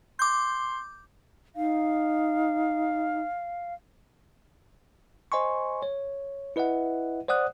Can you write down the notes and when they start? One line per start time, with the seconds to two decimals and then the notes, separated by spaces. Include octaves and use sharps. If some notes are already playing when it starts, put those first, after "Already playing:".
0.19 C6 D6 G6
1.56 D#4 F5
5.32 C5 D#5 G#5 C6 C#6
5.83 C#5
6.56 E4 B4 D#5 E5 F#5
7.29 C5 D5 F#5 D#6 F#6